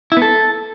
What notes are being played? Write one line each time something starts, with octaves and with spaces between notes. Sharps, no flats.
E4
B3
A4